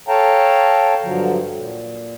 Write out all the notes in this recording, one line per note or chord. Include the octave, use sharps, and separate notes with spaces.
A4 C#5 F5 G5 A5 A#5
G2 D3 F3 F#3
A#2